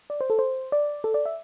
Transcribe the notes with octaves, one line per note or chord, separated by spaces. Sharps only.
D5
C5
A4
C5
D5
A4
D5
E5